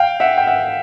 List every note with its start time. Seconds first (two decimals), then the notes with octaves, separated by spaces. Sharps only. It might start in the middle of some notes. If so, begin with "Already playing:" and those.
Already playing: F5 G5
0.20 E5 F#5
0.38 G5
0.47 E5 F#5